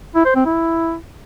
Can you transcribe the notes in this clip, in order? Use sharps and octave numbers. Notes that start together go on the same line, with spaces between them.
E4
C5
C4
E4